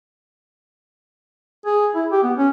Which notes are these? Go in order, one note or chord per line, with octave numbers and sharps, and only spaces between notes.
G#4
E4
G4
B3
C#4